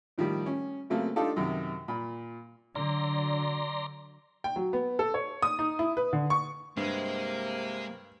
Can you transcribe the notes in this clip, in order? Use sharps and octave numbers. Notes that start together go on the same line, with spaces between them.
A2 D#3 F3 G3
C#4
C#3 F#3 A3 A#3 C4
D4 D#4 F4 G4 A4
F#2 C3 D#3
A#2 B5
D3 F#3 D5 A#5 C6
G5
F#3
B3
A4
C#5
D#6
D#4
E4
B4
D3
C#6
G2 C3 G#3 A#3